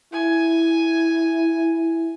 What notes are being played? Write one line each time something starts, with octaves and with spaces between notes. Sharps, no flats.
E4 G#5